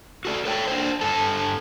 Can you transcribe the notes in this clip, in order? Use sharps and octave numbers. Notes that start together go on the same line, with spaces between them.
F#4 A4 D5
A4 C#5 G5
D4 C5
G2 A4 A5